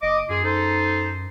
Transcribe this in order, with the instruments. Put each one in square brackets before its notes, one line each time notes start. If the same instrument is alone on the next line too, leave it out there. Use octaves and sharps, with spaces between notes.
[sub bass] F#1 [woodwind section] D#5 D6
[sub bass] F#2 [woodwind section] F4 G#4
[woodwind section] D#4 A4 C5